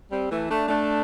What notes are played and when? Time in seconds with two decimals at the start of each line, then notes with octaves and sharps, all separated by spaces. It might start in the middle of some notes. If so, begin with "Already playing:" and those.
0.12 G3 C4
0.31 E3 A3
0.49 A3 D4
0.68 A3 D4